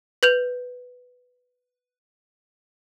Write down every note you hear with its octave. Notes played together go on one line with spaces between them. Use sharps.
B4 G6 F7